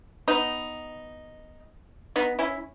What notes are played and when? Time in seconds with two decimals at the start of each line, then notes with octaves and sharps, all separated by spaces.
0.28 B3 D#4
2.16 B3 D#4
2.39 C#4 E4